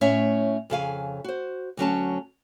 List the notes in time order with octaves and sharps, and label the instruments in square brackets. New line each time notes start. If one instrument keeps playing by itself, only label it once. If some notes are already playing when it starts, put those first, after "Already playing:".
[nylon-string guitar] A2 C#4 C#5 E5
F2 C#3 F5 G#5
F#4 C5
D2 F#3 C#4 A5